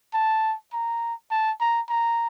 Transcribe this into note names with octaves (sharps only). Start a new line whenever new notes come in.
A5
A#5
A5
A#5
A#5